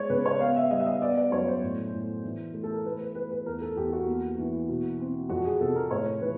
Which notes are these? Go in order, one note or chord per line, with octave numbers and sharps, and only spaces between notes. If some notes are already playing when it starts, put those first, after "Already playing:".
Already playing: G#3 C#5 D5
C#3 B4
C#5
B3 F5
E5
G3 D#5
E5
D#5
B3 D5
D5
F#2 C#5
C5
A2
A2
E3
A3
A4
A#4
A3 B4
B4
A3 B4
B4
E2 A#4
A4
E2 G4
F#4
A#3
E3
B2
C4
F2 F#4
G#4
C3 A4
A#4
A2 C#5
E3 B4